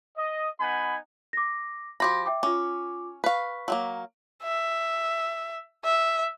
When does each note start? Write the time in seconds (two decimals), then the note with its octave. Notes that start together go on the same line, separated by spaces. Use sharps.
0.17 D#5
0.60 B3 D#4 F#5 G#5 B5
1.33 D6 A#6
2.00 F3 F#4 G4 B5 C6 A#6
2.26 E5 G5 D6
2.43 C#4 F4 D6
3.24 B4 F5 C#6 B6
3.68 F#3 A3 A#3
4.43 E5
5.85 E5